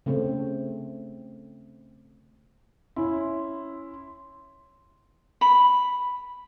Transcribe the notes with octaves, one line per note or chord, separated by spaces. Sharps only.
C#3 A3 C4
C#4 E4 C6
B5